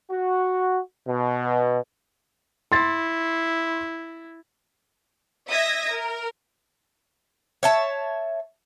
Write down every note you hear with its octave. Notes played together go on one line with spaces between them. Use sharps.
F#4
B2
E4 C6 A6
D#5 E5 D#6 G#6 A#6
A#4
C#5 E5 A5